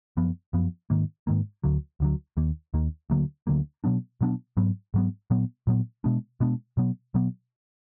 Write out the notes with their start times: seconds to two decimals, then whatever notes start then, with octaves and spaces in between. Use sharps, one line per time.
0.17 F#2 F3 B3
0.53 F#2 F3 B3
0.90 G#2 D#3 A#3
1.27 G#2 D#3 A#3
1.64 D2 D3 F#3
2.00 D2 D3 F#3
2.37 D#2 D#3 A#3
2.74 D#2 D#3 A#3
3.10 D2 D3 F#3 A#3
3.47 D2 D3 F#3 A#3
3.84 B2 F#3 B3 D4
4.21 B2 F#3 B3 D4
4.57 G#2 F#3 B3
4.94 G#2 F#3 B3
5.30 A#2 F#3 B3
5.67 A#2 F#3 B3
6.04 B2 G#3 B3 D4
6.40 B2 G#3 B3 D4
6.77 B2 F#3 B3
7.14 B2 F#3 B3